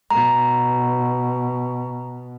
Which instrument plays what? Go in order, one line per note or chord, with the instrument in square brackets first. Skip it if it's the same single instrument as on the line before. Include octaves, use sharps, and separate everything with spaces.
[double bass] B2 [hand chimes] A#5